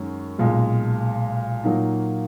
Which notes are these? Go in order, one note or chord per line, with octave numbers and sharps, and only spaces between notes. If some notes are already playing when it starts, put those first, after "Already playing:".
Already playing: F#2 D#3 G#3 C#4
B1 A#2 G#3
A#2 F#3 A#3 D#4